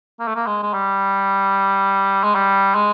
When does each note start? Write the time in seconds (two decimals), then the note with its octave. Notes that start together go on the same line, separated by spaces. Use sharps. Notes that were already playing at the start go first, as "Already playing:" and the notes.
0.20 A#3
0.28 A3
0.35 A#3
0.47 G#3
0.63 G#3
0.74 G3
2.24 G#3
2.35 G3
2.75 G#3